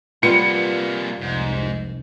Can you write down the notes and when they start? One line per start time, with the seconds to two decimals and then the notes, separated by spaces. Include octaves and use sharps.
0.23 C3 G3 A#3 B3 F4 C#7
1.21 F1 C2 G#2